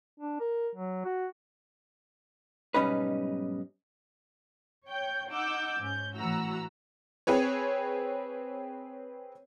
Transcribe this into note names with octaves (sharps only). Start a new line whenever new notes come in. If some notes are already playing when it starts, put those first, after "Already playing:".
D4
A#4
F#3
F#4
B1 G#2 G3 C#4 D#4 B4
C#5 G5 G6
D#4 F#5 D6 E6 G6
G#2 C#4 G6
A2 E3 F#4 F#5 A#5 E6
C4 G#4 B4 C#5